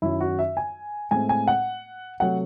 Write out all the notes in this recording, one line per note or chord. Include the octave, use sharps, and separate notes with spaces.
F#2 D#3 F#3 E4
F#4
E5
G#5
A2 G#3 C4 G#5
G#5
F#5
C3 F#3 A3 F#5